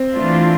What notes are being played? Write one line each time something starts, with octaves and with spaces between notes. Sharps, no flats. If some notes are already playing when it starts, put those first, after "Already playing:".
Already playing: C4
E3 A3 D4 F4